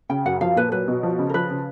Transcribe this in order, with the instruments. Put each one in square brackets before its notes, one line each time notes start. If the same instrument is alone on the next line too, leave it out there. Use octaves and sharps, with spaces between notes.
[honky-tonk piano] C#3 [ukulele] G5
[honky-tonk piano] F#2 [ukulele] F#5
[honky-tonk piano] F3 [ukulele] F5
[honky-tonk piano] A#2 [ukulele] B4
[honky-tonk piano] F#3 [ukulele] B4
[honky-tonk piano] B2
F3
C#3
[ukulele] A#4
[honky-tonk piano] F3 [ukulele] B4
[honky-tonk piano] C#3